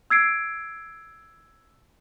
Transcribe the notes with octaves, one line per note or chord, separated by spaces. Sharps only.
E6 G#6 C7 D7